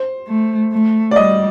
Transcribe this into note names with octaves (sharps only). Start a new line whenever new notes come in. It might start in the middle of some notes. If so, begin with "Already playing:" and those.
Already playing: C5
A3
A3
D5
G3 D#5